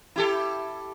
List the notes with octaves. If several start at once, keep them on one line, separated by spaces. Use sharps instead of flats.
E4 G4 A4